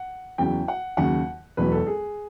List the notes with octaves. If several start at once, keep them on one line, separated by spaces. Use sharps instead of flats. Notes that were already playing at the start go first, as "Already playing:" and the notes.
Already playing: F#5
E2 C#3 F#3 G5
F#5
D#2 C#3 F#3 F#5
E1 E2 B2 F#3 B4
A4
G#4